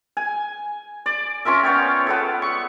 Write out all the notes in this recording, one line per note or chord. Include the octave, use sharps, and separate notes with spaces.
G#5
D5
C#4 F4 A#4 E5
B3 C#5 D5 G5
B3 A4 D5
C#6